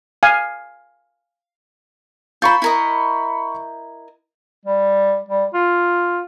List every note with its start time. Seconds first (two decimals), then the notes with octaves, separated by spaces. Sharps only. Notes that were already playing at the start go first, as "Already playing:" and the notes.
0.23 F5 G#5
2.42 F4 A#4 C5 B5 C#6 G6
2.62 E4 A#4 D#5
4.65 G3
5.29 G3
5.54 F4